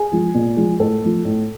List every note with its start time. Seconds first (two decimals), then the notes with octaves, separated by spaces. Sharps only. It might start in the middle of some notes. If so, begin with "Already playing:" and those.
Already playing: G#4
0.12 F3 G#3
0.35 A#2
0.57 F3 G#3
0.80 A2 A4
1.02 F3 A3
1.25 A2